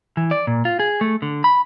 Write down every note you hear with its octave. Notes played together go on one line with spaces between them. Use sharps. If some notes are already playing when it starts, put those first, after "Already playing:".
E3
D5
A#2
F4
G#4
A3
D3
B5